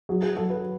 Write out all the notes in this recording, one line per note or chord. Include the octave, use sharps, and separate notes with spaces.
F#3 G#4
G#4
F#3 A4
B4